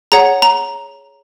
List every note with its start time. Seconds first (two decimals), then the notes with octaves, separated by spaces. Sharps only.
0.12 G#4 C#5 F#5 A#5
0.42 A#5